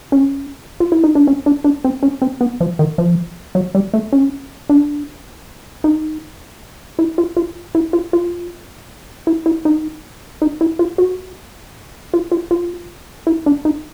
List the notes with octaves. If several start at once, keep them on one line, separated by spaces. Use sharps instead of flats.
C#4
F4
E4
D#4
D4
C#4
D4
D4
C4
C#4
C4
B3
F3
D#3
F3
F#3
G3
A3
C#4
D4
D#4
E4
F4
F4
E4
F4
F4
E4
E4
D#4
D#4
E4
F4
F#4
F4
F4
F4
E4
D4
D#4